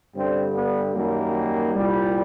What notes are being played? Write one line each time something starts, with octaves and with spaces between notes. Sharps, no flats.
G2 D3 G3 C4
B3
F#2 D#3 G3 A#3
C2 A#2 G3